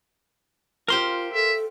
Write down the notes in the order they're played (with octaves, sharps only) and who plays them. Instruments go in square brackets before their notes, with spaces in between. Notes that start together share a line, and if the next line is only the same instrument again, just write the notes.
[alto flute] F4 [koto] G4 C5 F5 [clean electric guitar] A#4 C6
[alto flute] A4 [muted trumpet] E5